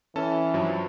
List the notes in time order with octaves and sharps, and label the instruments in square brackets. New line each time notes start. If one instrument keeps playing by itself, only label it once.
[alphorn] E3 [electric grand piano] C#4 A4 A5
[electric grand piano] G2 F3 F#3